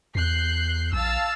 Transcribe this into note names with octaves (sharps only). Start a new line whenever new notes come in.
E2 F#6 G6 C7
A#1 F5 A5 E6